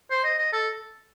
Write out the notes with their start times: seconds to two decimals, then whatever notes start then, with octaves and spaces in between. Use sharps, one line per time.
0.10 C5
0.24 D#5
0.38 D#5
0.53 A4